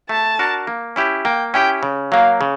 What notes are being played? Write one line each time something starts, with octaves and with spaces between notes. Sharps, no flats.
A3 A5
D4 F#4 A#4
A#3
C#4 E4 G4
A#3 G5
C#4 E4 G4 G5
C#3
F#3 A#3 F5
C#3